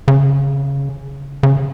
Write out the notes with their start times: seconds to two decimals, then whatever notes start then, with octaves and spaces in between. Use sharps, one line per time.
0.08 C#3
1.43 C#3